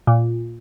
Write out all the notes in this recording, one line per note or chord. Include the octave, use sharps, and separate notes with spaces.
A#2